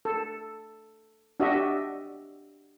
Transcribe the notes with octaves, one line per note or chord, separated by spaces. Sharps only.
A4
D4 F#4 G4 D#5 E5